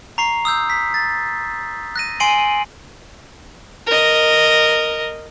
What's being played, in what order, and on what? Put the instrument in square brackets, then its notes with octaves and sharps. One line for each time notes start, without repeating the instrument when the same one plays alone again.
[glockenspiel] A#5 C#6 C7
D#6 E6 G6
B6
A6
F#6 A#6 D#7
G#5 C6 C7 D7 D#7 F#7
[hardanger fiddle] A#4 D#5